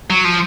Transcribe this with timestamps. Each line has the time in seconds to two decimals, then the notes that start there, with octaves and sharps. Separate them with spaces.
0.10 F#3
0.25 F3